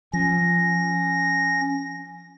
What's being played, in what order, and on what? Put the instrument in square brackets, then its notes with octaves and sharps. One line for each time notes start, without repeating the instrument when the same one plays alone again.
[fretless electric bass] F3 [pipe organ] C#4 A#6